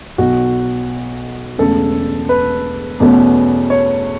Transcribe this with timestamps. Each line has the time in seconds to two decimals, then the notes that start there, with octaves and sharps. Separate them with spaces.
0.18 B1 B2 F#3 F#4
1.58 E1 E2 C#3 A3 A4
2.29 B4
3.00 E2 B2 A3 C#4
3.70 C#5